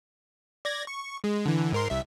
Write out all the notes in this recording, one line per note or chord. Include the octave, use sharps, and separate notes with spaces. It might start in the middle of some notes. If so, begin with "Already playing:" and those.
D5 G#6 A#6
C#6
G#3
D3 E3
G#2 A#4 C6
C2 E5